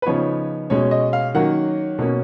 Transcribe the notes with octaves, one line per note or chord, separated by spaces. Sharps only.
B4
C#3 F3 B3 D#4 C#5
B2 G#3 C#4 C#5
D#5
F5
D#3 F#3 A#3 C#4 F#5
B2 A#3 C#4